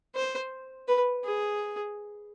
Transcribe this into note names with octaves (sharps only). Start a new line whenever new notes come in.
C5
B4
G#4